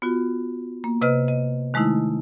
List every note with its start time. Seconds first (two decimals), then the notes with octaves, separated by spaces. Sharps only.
0.02 B3 F4 F#4
0.84 A#3
1.01 C3 B4 D#5 F6
1.28 D#5
1.74 D#3 G#3 A3 D#4 E4